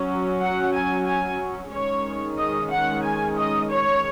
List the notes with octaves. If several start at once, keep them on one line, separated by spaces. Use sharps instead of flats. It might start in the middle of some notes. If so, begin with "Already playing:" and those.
Already playing: F#3 C#4
F#5
G#5
G#5
D#3 G#3 C#4 C#5
D#5
F#5
G#5
D#5
C#5